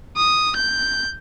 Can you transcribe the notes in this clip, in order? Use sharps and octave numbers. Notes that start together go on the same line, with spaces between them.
D#6
G6